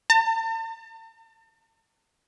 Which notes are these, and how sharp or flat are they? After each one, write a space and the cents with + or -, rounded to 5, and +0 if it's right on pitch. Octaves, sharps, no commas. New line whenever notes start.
A5 +45